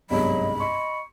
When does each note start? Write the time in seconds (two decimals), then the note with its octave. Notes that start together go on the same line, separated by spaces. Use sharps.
0.10 G1 C2 G#2 F#3 D#5 B5
0.60 D#5 C6 C#6